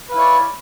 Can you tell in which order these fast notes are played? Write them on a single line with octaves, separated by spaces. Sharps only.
B4 F5 E4 C#5 D5